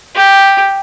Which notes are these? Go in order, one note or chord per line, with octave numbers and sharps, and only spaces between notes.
G4